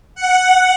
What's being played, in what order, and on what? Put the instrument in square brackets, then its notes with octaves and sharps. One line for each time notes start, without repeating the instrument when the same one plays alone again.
[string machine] F#5